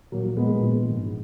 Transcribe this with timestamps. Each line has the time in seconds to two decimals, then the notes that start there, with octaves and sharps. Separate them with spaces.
0.12 A#1 F#3 A#3
0.37 A#2 G#3 B3
0.60 A#1
0.85 G#1